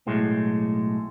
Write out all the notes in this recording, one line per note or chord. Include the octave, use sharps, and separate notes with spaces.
B1 A2 G#3